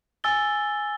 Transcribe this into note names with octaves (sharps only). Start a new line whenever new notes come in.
G#5 E6 A6 G7